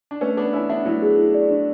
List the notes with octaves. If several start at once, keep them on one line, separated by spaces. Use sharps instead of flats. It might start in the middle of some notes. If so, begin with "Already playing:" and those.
D4
A3 C#4 B4
B3 D4 B4
C#4 E4 B4
B3 D4 E5
F#3 A3 E4
G#4
E4
D5
D4